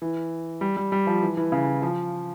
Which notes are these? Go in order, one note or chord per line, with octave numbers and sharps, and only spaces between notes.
E3
G3
G3
G3
F3
E3
E3
C#3
E3
F3